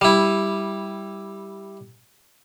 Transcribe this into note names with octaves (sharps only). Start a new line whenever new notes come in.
G3 E4